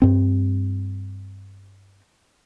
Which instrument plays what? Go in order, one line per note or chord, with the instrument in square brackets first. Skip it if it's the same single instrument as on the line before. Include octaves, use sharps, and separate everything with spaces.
[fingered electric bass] G2 C4